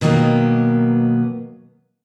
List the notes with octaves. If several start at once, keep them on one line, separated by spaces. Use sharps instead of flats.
B2 D#3 F#3 G3 A#3 B3